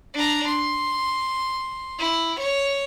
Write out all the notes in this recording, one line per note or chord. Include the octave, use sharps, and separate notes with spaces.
D4 A#5
C6
E4
C#5